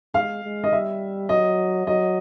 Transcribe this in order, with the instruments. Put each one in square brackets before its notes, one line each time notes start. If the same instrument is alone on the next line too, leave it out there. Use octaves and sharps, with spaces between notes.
[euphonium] G#3 [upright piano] F5
[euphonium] G#3
[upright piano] D#5
[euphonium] G3 [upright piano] E5
[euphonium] F#3 [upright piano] D#5
[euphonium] F#3 [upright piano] D#5